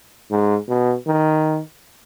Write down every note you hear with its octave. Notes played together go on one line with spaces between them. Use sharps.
G#2
B2
D#3